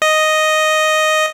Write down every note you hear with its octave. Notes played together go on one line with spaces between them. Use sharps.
D#5